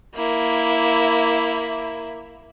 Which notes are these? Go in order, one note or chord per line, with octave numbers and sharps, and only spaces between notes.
A#3 E4